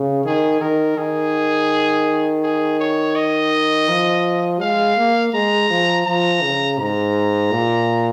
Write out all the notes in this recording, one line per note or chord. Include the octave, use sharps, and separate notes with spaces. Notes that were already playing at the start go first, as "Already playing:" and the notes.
Already playing: C#3
D#3 G#4
D#3 A#4
D#3 G#4
G#4
C#5
D#5
F3
G#3 F5
A#3
G#3 A#5
F3
F3 A#5
C#3
G#2 A#5
A#2